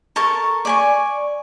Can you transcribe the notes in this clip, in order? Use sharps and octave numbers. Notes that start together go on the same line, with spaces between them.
A4 A#4 A5 C#6
D5 G#5 C#6